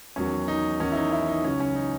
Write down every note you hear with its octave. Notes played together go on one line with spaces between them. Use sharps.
E2 D#3 F#3 C#4
D#4
E2 D#3 F#3 C#4
E4
D#4
E4
D#4
C#2 C#3 F#3 C#4
C#4
D#4